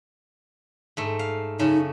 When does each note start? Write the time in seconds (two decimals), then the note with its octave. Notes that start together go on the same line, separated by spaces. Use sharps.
0.97 G#2 A3
1.19 F5
1.59 F#2 C#3 A3 D#4